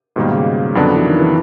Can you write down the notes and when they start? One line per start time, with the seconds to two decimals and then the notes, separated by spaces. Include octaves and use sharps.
0.16 G#2 B2 D#3 G3 A#3
0.31 C#3
0.75 F2 D3 F#3 B3 D4
0.96 E3
1.05 D#3
1.19 E3